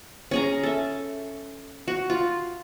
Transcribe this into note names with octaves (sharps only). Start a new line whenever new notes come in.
C#4 G#4 A#5
A4 E5
F#4
F4